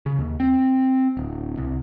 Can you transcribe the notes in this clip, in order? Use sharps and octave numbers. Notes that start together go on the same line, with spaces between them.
C#3
D#2
C4
D1
C2